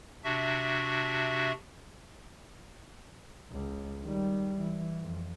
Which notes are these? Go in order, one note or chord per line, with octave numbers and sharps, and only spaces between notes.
C3 D4 F#4 E5
C#2
D#3 G3
E3
F2